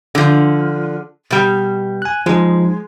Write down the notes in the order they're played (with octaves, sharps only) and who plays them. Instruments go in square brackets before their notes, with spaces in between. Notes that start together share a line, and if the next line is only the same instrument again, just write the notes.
[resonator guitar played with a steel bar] D3 F3
B2 G3
[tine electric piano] G#5 F#6
[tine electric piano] F3 D#4 [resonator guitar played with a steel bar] G#3